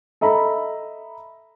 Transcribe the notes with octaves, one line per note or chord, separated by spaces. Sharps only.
A4 D#5 E5 A#5 B5